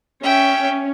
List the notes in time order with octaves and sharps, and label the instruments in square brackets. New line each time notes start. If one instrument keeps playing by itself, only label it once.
[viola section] C#4 [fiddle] E5 G5